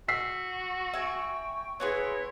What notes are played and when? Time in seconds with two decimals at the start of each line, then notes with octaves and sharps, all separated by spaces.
0.08 F#4 E6 B6 C7
0.94 E5 G5 G#5 C#6
1.80 B3 E4 F#4 G#4 B4 C#5 C6